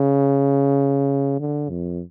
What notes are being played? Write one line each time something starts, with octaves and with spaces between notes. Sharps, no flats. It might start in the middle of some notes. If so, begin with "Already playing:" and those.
Already playing: C#3
D3
F2